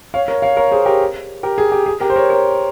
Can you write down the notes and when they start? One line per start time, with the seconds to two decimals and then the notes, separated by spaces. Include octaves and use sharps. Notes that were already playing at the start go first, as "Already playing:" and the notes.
0.14 C#5 F5
0.28 A#4 C#5
0.42 C#5 F5
0.57 A#4 C#5
0.71 G#4 C5
0.86 G4 A#4
1.43 G4 A#4
1.58 G#4
1.72 G4
1.86 G#4
2.00 G4 A#4
2.10 C5
2.16 A#4 C#5
2.30 A#4 C#5